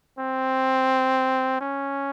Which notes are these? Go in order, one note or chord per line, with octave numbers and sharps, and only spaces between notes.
C4
C#4